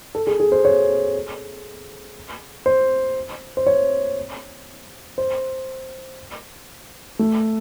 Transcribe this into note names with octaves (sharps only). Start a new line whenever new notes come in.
A4
G#4
G#4
C5
C#5
C5
C5
C#5
C5
A3